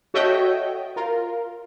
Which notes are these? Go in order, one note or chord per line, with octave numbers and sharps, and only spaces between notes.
F#4 A4 C#5 D#5 E5 G5
F4 A#4